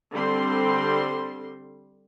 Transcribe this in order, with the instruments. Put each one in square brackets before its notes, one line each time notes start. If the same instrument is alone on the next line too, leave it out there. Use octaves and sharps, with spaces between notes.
[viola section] D3 G3 C4 C6